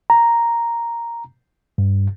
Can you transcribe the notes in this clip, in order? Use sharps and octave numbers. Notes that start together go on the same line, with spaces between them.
A#5
G2